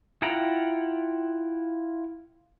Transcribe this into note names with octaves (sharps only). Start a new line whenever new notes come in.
E4 F4 F#5 G5 A#5